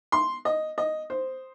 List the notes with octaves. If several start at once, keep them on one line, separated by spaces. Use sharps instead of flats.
C6
D#5
D#5
C5